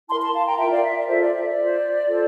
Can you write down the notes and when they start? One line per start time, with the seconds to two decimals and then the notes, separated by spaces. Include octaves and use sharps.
0.09 E4 A5 C6
0.14 A#4
0.22 A5 C6
0.34 F5 A5
0.46 G5 A#5
0.59 F4 A#4 E5 G5
0.71 D5 F5
0.83 E5
0.96 D5
1.08 F4 A4 C5 E5
1.21 D5
1.33 E5
1.45 D5
1.57 F4 C5
2.07 F4 A4 C5